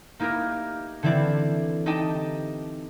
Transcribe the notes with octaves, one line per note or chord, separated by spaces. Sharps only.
A#3 D#4 E4 G4 A#4
D3 E3 C4 E4 D5
D#4 G4 D#5 G5 A5